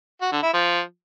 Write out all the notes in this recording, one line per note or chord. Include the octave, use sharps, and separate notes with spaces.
F#4
D3
E4
F3